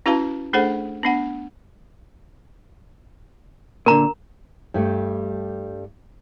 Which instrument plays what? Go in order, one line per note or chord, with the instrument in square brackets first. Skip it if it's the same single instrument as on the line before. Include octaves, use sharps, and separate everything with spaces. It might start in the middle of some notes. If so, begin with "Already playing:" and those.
[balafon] C#4 E4 F#4 B4 F5 A5
A3 D4 G#4 A4 C5 F#5
B3 D4 F#5
[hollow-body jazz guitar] A#2 D3 [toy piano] A#4 A#5
[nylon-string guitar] G2 G3 A3